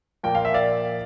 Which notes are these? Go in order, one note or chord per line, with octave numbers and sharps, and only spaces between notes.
A#2 F3 A#3 G5
F5
E5
D5 F5